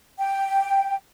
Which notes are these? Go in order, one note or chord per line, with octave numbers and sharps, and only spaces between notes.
G5